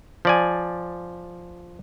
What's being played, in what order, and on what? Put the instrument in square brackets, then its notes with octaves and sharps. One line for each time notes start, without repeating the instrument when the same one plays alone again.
[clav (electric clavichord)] F3 D5 G#5